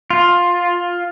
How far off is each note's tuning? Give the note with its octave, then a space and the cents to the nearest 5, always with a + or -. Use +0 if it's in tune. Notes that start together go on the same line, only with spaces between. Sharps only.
F4 +10